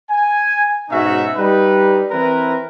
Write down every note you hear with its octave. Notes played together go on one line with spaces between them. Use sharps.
G#5
G#2 B2 C#4 D#4 F#4 E5
G3 D#4 B4
E3 C4 E4 A#4 B4